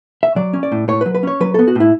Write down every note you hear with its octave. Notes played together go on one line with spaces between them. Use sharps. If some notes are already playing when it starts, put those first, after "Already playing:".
E5
F#3 D5
C#4
D5
A2
A2 C#5
B4
F#3
B4
C#4 C#5
F#3 B4
B3 A4
F#4
A2 E4